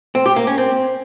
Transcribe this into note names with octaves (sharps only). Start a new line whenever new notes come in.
C4
G4
A#3
C#4
C4